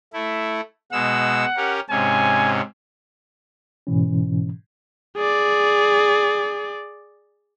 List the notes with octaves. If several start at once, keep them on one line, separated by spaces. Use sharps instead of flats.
A3 E4
B2 G#3 F#5 E6
C#4 G4 A#4
G#2 C3 C#4 G#5
G#2 B2 E3 C#4
G#4 D5